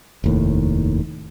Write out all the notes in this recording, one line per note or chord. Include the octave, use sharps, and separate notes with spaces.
F1 D#2 A2